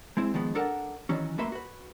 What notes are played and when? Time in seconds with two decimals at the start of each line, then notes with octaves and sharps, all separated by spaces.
0.17 G#3 C4 E4
0.34 D#3 F3 G#3 B3
0.55 D4 A4 A#4 F#5 A5
1.09 D#3 E3 F#3 C#4
1.38 A3 A#3 F#4 B4 E5 C6
1.52 F#4 B4